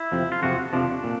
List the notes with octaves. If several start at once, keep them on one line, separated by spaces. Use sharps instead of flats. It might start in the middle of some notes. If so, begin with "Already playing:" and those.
Already playing: E4
F2 C3 F3
F4
F2 C3 F3 F#4
F2 C3 F3 D4
A#2